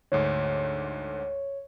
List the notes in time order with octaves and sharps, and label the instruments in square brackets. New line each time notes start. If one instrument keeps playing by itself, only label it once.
[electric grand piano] D2 G#2 D3 [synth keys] C#5